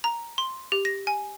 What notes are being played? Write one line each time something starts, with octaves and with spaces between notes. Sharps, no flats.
A#5
C6
G4
A#6
G#5